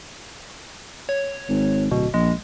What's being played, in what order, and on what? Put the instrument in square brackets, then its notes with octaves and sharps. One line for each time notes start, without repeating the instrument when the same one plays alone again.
[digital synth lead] C#5
[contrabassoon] G#1
[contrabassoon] D1 [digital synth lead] B2
[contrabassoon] A#1 [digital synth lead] G#3